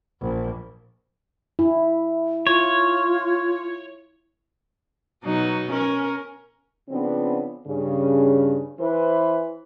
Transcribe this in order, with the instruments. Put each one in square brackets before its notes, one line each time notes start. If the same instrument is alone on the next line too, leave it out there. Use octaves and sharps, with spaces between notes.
[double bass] A#1
[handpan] E4
[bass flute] F4 [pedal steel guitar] C#5
[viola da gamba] B2 F#3 D#4
C#4 A#4
[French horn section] C#3 F3 B3 C4 D4
G2 C#3
E3 B4 C5